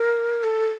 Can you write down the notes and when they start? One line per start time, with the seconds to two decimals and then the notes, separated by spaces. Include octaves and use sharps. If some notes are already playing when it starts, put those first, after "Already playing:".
Already playing: A#4
0.44 A4